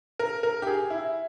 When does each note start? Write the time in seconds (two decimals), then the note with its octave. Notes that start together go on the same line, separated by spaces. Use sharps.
0.19 A#4
0.43 A#4
0.62 G4
0.67 G#4
0.90 E4